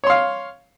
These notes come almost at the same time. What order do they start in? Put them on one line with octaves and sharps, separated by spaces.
C#5 C6 F5